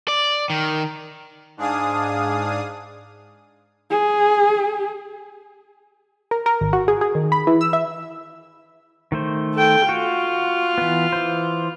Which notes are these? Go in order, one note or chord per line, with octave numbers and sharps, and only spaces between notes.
D5
D#3
G#2 D4 G#4 F5 D#6
G#4
A#4
A#4
G#1
F#4
G#4
G#4
D#3
B5
E3
E6
E5
D#3 A3 C5
A4 G5
F4 F#4
E3 B3
E3 C5